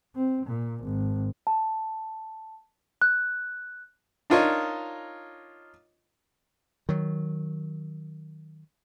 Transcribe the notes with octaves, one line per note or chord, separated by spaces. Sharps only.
C4
A#2
G#1
A5
F#6
D4 D#4 F4 A#4 C#5 D#5
D#3 F#3